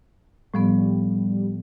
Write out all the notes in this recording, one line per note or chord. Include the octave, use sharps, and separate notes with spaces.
A2 F3 G3 B3